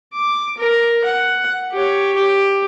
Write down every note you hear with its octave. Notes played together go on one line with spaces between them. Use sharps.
D6
A#4
F#5
G4 C#5
G4